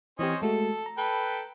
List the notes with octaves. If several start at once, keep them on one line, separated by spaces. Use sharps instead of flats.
E3 C4 C#4 G4 C5 D#5
G#3 A3 F#4 A4
A#5
A4 B4 G5